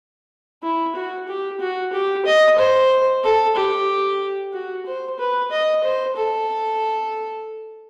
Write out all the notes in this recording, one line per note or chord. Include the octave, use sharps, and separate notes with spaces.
E4
F#4
G4
F#4
G4
D#5
C5
A4
G4
F#4
C5
B4
D#5
C5
A4